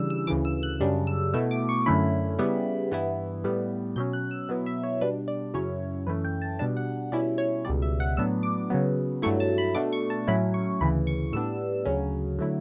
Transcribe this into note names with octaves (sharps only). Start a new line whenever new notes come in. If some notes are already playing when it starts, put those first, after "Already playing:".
Already playing: C#3 E3 G3 D4 E6
E6
D2 C#3 E3 D6
E6
F#6
F#2 C#3 G3 D4
E6
B2 A3 E4 E6
D6
C#6
F#2 D3 A3 C#4 E4 B5
C#3 G3 B3 E4
G2 E3 B3 E4
A2 G3 B3
B2 F#3 C#4 G6
F#6
E6
B2 F#3 B3 E4
E5
C#5
B2 G3 D4 B4
D5
F#2 C#3 F#3 C#4 E4 C#5
F#2 E3 A3 C#4 B4
G5
A5
B2 G3 D4 A5
F#5
B2 G3 C#4 E4 D5
C#5
C#2 B2 G3 D5
E5
F#5
A2 F#3 B3 D4 E6
D6
C#3 F#3 B3
G2 F#3 A3 E4 C#6
A5
B5
B2 A3 D4 D6
C#6
A5
A2 F#3 C#4 E4 B5
C#6
D2 C#3 E3 B5
C#6
A2 G3 B3 D4 E6
D2 C#3 F#3 C#4
D3 F#3 A3 E4